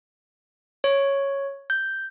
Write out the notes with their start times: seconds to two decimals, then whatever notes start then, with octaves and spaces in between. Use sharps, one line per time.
0.84 C#5
1.70 G6